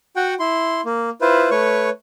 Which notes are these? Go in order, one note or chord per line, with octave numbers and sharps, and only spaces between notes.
F#4 F#5 G5
E4 C6
A#3
E4 F4 B4 C5
A3 B4 C#5 C#6